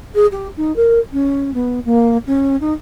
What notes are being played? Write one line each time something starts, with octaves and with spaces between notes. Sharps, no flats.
G#4
G4
D#4
A#4
C#4
B3
A#3
C#4
D#4